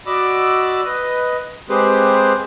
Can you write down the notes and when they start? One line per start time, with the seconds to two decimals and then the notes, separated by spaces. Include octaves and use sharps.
0.06 F#4 D5 D#5 B5 D6 E6
0.85 B4 D#5
1.69 G#3 C4 G4 G#4 B4 C5